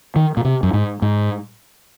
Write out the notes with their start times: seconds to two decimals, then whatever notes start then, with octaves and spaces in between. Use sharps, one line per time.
0.16 D#3
0.37 A#2
0.45 C3
0.63 F#2
0.73 G#2
1.02 G#2